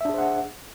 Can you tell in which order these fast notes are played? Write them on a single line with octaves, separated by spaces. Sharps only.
E5 D4 G#4 C5 F#5